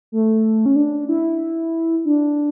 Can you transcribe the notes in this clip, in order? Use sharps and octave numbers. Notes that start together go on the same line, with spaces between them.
A3
C#4
D4
E4
D4